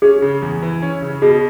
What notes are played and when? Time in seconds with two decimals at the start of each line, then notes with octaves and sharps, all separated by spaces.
0.02 C#4 G#4
0.22 C#3
0.42 E2
0.62 E3
0.82 C#4
1.02 C#3
1.22 B2 G#4